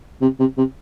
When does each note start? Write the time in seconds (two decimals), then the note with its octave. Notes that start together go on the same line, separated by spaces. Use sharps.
0.21 C3
0.39 C3
0.57 C3